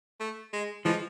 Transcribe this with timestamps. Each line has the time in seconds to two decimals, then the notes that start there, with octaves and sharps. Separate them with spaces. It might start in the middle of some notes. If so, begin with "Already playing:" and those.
0.20 A3
0.53 G#3
0.85 E3 F3 G#3